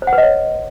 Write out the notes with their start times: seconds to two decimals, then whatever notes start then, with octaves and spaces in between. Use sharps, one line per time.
0.02 C5
0.07 F#5
0.13 B4
0.18 D#5
0.23 C#5